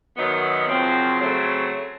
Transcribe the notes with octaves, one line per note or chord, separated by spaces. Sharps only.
F#2 D#3 F#3 B3
F#2 C#3 F3 C4
C#3 F#3 A3 C4